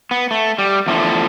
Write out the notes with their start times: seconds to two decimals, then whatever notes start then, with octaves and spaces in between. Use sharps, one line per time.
0.11 B3
0.31 A3
0.58 G3
0.87 E2 D3 F3 A3